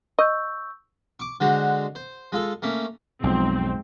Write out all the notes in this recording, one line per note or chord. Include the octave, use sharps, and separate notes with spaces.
D#5 C#6 E6 G6
C#6 D6
D3 G#3 F#4 C5
C5
G#3 F4 A4
A3 A#3 C#4
B1 F2 G#2 C4